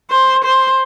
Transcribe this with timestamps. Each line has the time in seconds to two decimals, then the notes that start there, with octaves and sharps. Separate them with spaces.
0.11 C5
0.44 C5